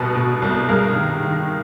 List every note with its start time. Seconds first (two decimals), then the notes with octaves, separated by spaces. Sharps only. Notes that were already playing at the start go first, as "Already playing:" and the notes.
Already playing: C2 B2 A4 B4
0.15 B2
0.42 C2
0.69 G2 G#4 A#4
0.96 D#3
1.23 D#3